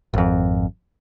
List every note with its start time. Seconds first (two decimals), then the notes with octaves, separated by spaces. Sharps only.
0.14 G#1 F2